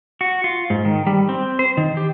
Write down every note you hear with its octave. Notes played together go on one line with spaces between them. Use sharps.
F#4
F4
G#2
D#3
G3
C4
C5
D#3
G4